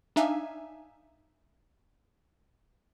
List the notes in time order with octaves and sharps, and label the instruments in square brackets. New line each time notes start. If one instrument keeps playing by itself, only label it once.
[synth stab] D4 D#4 E5 F5 G#5